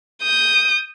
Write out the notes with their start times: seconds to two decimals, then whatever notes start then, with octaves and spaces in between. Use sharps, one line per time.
0.23 D#6 G6